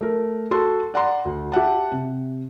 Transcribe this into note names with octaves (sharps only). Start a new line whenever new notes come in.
A3 A#4
F#4 A4 C6
D5 F#5 A#5 C6
D2
G4 E5 F#5 A5
C3